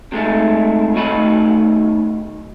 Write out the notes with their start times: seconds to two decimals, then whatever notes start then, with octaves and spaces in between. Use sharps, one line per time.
0.12 C3 G#3 A3 D#4
0.94 B1 F#2 D#3 A3 D#5 B5